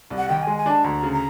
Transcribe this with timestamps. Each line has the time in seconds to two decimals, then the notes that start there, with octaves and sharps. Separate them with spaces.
0.10 C2
0.18 F#5
0.29 D#3 G5
0.43 G#3 G#5
0.57 G#5
0.66 D4 A5
0.84 D2 A#5
1.03 C#3
1.12 A#5